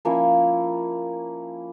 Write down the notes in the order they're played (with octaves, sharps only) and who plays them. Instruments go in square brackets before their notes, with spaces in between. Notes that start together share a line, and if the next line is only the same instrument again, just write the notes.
[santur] F3 A#3 C#4 E4